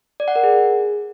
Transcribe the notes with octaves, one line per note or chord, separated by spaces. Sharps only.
D5
F#5
A#4
G#4